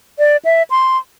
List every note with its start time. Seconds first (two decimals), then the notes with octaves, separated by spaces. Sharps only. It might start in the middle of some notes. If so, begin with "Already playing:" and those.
0.19 D5
0.45 E5
0.70 C6